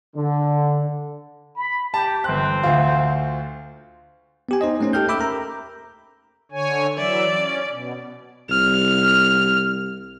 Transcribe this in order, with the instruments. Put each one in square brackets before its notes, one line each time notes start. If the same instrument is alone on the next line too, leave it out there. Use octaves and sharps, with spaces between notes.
[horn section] D3
[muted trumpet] B5
[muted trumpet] G4 [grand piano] A5
[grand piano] G1 F#6 [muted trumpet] C4
[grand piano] D2 F4
[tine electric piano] B3 G4 G#5
D#4 C5 D#5
A3 A#3 C#4 D#4 C5
G4 A4 G5 F6 G6
E5 B5 D6 E6 G6
A#4 A#5
[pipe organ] D3 C#5 G#5
[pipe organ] E3 F#3 E5 [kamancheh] D5
[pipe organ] C#4
B2
[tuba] C2 [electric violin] F6